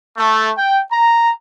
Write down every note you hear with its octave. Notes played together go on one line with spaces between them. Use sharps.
A3
G5
A#5